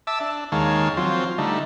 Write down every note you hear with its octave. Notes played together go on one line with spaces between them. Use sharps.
E5 A5 D6 E6
D4
D#2 D#3 G#3 C#5 F5 A5
F3 F#3 C4 F4
D3 G3 A3 D#4